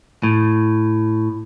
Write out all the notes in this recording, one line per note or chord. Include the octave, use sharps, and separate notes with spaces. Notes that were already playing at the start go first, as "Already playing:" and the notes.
A2